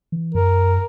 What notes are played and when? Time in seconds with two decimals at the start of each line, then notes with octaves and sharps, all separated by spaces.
0.12 E3
0.35 F#2 A#4